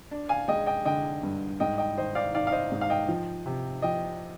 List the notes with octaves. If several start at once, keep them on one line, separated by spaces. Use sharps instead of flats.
D4
F5 G#5
G#3 D#5 G5
D#5 G5
D3 D#5 G5
G2
G#2 D#5 G5
D#5 G5
D#3 C5 D#5
D5 F5
D#3 D5 F5
F5
C5 D#5
G#2
F5
D#5 G5
F3
C3
F3 D#5 G5